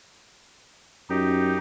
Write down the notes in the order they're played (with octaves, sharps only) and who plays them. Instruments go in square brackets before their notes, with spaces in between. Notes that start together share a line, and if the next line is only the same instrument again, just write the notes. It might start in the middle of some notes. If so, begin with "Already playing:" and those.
[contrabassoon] F#2 [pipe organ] D#4 G4